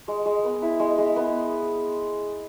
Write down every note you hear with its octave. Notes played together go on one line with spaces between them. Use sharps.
G#3
G#3
B3
E4
G#3
G#3
B3